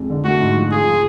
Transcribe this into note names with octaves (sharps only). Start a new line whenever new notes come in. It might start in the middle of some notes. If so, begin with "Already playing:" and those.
Already playing: F2 G#3
D3
A3 F#4
G#2
F3
F4 G#4
F3